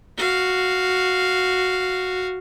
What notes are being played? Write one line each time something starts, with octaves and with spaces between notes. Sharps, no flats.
F#4 F5